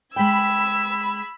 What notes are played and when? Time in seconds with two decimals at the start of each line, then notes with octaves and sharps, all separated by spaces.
0.16 G#3 G5 B5 E6 G#6